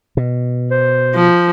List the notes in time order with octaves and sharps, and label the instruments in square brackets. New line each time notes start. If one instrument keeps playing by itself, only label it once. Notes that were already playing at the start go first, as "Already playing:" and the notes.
[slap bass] B2
[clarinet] C5
[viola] F3